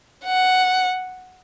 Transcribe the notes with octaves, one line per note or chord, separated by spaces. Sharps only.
F#5